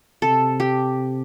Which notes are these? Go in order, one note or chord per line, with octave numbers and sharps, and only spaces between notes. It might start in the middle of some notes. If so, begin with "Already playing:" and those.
C3 A4
G4